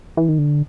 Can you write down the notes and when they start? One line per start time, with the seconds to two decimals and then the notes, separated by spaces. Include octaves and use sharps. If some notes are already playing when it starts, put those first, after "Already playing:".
0.17 E3
0.29 D#3
0.39 D3